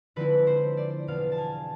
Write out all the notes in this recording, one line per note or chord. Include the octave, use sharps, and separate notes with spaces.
D3 F3 G#3 C4 E4 B4
C5
D5
E2 B2 B3 D4 F5
A5
G#5